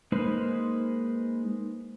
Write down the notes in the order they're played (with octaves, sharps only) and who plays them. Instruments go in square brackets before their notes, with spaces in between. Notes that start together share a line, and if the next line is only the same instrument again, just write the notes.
[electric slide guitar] G#3 A#3 D#4 B4 C5